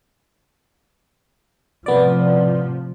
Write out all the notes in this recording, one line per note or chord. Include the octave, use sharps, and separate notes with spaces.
A2 C3 F3 B3 D5